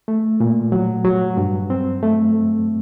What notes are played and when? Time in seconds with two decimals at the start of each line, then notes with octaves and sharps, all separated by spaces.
0.08 A3
0.40 A#2
0.72 F#3
1.05 F#3
1.37 G2
1.70 C4
2.03 A3